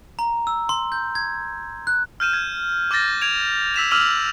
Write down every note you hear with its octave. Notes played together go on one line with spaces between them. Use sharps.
A#5
E6
C6
G6
G#6
F#6
F6 G6 D#7 E7
G#6
D6 F6 G6 A6 A#6
G#6 D7 F7
E6 B6 E7 F7
D6 E6 F6 D#7 F7 F#7